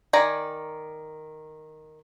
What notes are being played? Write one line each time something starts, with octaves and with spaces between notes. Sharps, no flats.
D#3 D5 G#5 A#5